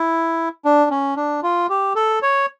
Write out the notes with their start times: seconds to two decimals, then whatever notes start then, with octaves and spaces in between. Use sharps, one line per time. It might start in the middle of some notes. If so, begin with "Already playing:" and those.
Already playing: E4
0.65 D4
0.91 C#4
1.17 D4
1.43 F4
1.69 G4
1.95 A4
2.22 C#5